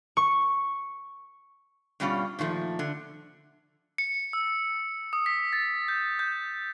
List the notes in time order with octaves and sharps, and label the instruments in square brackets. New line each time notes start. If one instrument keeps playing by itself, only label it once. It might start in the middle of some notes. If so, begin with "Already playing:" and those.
[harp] C#6
[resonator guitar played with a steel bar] G2 B2 G3 C#4 F4
A#2 D#3 F3 A3
D3
[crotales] C#7
E6
D#6
B6
A6
G6
G6